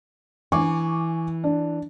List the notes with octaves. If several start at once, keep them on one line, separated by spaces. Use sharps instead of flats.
E3 G#5 C#6 D6
D4